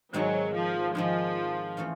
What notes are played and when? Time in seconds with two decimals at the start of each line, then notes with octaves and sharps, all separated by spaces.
0.13 G#2 D#3 F#3 G#3 C4
0.54 F3
0.94 G#2 D#3 F3 G#3 C4
1.77 E3 A3 C#4 F4